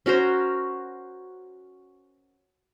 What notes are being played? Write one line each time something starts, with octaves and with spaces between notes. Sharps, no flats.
C#4 F#4 A#4 C5